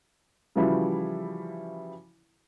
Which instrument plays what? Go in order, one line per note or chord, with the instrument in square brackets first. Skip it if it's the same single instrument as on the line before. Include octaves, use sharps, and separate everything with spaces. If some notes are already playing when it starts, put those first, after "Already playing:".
[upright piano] C#3 E3 F3 G3 E4 F#4